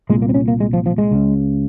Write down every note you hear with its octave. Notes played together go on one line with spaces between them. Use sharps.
C2 A#2 G#3
A#3
C4
C#4
A#3
G#3
F3
F3
G#3
C#2 C#3